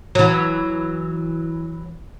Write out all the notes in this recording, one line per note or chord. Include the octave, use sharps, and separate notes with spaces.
E3 F#3